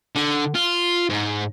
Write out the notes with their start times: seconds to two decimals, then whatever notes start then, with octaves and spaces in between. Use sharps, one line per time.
0.16 D3
0.55 F4
1.10 G#2